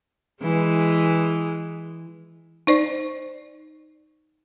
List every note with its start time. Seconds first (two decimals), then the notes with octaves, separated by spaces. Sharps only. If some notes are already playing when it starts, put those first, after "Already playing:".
0.42 E3 G#3
2.67 D#4 C5 D5